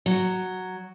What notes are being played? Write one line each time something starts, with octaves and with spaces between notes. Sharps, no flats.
F#3